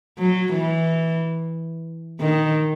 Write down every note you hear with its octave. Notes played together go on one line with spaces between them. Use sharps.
F#3
E3
D#3